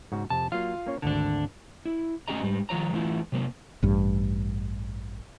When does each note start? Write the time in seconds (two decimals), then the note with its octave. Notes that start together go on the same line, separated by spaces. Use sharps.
0.12 G#2 C#3 F#4
0.30 F2 C3 A5
0.52 F#3 A#3 F4 F5
0.86 A#3 C#4 C#5
1.02 G#1 D2 D3 D4 A5
1.86 E4
2.28 A3 C#4 F#4 G#4 D#5 A#5
2.42 G#2 G3
2.69 D#3 F3 F4 C#5 A#5
2.93 E3 A3 E4 F4
3.32 C3 F#3 A#3
3.83 A1 G2